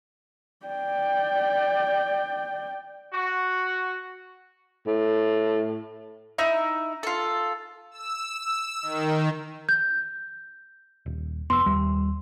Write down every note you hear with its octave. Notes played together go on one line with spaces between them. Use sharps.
D5 G5
F#4
A2
D#4 E4 E5
F4 A4
E6
D#3
G6
D#1
F1 B3 C6 E6
D#2 G3